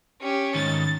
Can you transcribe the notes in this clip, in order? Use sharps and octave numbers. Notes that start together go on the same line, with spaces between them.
C#4 G4
G#2 D#3 A6